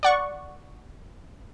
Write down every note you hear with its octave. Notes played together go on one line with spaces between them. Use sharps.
D5 F#5 C#6